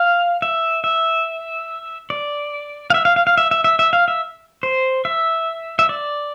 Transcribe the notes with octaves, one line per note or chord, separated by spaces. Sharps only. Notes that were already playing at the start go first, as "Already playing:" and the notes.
Already playing: F5
E5
E5
D5
F5
E5
F5
F5
F5
E5
E5
E5
E5
F5
E5
C5
E5
E5
D5